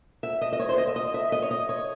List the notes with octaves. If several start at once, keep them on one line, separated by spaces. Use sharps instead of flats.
E5
D#5
D#5
C#5
C5
D#5
E5
D#5
E5
D#5
C#5
D#5
C#5